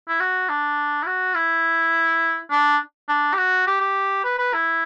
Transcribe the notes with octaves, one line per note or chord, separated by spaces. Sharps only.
E4
F#4
D4
E4
F#4
E4
D4
D4
G4
F#4
G4
G4
B4
B4
E4